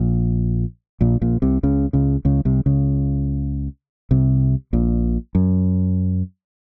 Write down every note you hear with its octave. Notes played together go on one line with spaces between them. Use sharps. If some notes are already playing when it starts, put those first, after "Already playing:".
Already playing: A#1 A#2
A#1 A#2
A#1 A#2
C2 C3
C#2 C#3
C#2 C#3
C#2 C#3
C2 C3
C#2 C#3
C2 C3
A#1 A#2
F#2